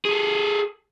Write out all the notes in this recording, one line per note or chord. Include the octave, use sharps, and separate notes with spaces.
G#4 A4